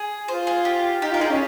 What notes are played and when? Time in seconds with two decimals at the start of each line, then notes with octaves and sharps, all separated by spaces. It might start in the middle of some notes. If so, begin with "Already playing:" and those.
Already playing: G#4
0.28 F4 C5
0.47 G#4
0.65 G4
1.02 D#4 G4
1.12 F4 A#4
1.21 D#4 G#4
1.30 C#4